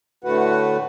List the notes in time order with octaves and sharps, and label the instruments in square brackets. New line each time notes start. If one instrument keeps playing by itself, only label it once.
[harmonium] A2 D3 A3 F#4 B4 F#5